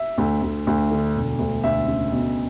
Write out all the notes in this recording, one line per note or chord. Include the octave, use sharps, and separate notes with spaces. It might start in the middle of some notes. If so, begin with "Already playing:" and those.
Already playing: E5
D2
D2
D2
D3
E1
D2
D2 E5
C#3
B2